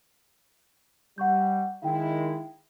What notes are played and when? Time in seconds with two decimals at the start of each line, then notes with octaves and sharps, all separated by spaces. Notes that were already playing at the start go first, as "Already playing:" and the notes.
1.18 G3 F#5 C#6 G6
1.82 D#3 G#3 E4 F5 G5